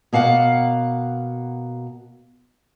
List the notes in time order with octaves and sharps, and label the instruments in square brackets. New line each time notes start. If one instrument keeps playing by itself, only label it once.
[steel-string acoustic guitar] B2 A#3 F5 F#5